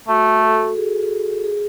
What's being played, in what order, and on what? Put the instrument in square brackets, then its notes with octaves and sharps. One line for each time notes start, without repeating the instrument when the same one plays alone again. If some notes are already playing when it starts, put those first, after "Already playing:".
[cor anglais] A3 [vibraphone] F#4
[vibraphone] A4
G#4
G#4